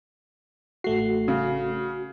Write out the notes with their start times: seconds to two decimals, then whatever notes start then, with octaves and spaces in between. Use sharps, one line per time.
0.84 A1 A3 F#4 C7
1.28 C#3